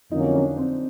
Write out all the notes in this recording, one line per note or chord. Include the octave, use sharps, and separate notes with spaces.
F2 D3 F#3 A#3 C#4 D#4
D4
C4